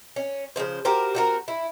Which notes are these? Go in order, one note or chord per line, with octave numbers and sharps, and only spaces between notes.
C#4
C#3 E3 F3 C5
F#4 G4 A#4 C5
C4 F#4 A#4
E4